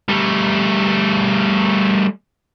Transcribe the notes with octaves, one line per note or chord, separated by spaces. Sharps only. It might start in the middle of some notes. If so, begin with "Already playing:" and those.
G3 A3